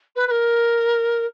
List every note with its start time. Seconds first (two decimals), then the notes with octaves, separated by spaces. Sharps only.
0.15 B4
0.27 B4
0.31 A#4